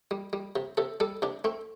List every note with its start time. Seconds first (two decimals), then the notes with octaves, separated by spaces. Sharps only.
0.11 G3
0.33 G3
0.56 C3
0.77 C3 A4
1.00 G3 A4
1.22 C3 D4
1.44 A3 C4